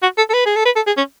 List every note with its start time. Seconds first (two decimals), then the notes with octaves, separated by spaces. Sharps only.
0.02 F#4
0.18 A4
0.30 A4
0.34 B4
0.46 G#4
0.56 A4
0.65 B4
0.76 A4
0.87 G#4
0.97 C#4